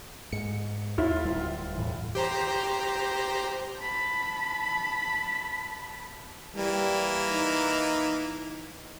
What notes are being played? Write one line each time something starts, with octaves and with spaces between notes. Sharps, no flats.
G#2 C#7
D#2 E4 F4 E5 F6
D1 G3
E2 A2 E3
G4 C5 A#5
A5 B5
E3 G3 A#3
D#4